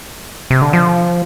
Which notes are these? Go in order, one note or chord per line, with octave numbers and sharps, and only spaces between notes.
C3
D3
F3